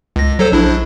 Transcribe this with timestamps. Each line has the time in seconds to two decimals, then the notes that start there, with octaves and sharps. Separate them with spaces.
0.16 C#2 A#6
0.39 F#3 A4 C5
0.52 A#1 D4 E4